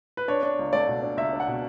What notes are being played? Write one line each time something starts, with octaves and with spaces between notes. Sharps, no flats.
B4
D4 C#5
D4
C#2
A3 D5
B2
D4
C#2 E5
D4
F#5
B2